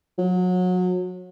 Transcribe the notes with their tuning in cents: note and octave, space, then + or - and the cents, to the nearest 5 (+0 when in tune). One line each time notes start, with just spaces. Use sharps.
F#3 -30